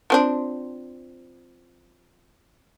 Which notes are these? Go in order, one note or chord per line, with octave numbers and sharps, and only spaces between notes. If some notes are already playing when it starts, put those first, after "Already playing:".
F3 C4 D4